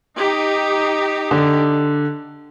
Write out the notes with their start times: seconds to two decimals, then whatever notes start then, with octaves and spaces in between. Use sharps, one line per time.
0.17 D#4 G4
1.31 D3